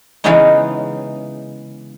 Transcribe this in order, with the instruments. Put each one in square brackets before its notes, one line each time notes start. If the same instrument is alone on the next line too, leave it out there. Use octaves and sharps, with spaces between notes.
[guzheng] C#3 E3 G#3 B3 C#4 D#4